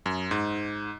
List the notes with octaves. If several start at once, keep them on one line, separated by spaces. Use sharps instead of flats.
F#2
G#2